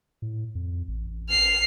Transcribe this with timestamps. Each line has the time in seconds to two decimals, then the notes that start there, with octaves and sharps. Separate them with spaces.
0.22 A2
0.55 F2
0.88 A1
1.30 F6 C7